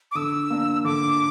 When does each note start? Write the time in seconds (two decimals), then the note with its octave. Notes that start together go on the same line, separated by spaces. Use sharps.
0.11 D6
0.15 D3 E6
0.50 A#3 D4
0.84 D3 D6